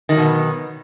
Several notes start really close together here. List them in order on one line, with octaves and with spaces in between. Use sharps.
D#3 G#3 F#3 B2 B3